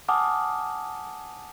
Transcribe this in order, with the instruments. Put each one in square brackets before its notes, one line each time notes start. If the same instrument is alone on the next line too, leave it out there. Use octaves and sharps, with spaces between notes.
[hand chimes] F#5 G#5 A5 D6 D#6 F6